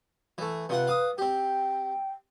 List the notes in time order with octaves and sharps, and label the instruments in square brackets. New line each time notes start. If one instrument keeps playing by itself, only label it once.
[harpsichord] E3 A3
[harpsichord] C3 F4 F#5 [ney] B4
[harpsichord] F5 D6 D#6
[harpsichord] C4 G4 [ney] G5